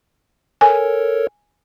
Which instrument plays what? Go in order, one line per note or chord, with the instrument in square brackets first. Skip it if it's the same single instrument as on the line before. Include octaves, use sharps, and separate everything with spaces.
[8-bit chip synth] A4 A#4 C#5 [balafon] G#5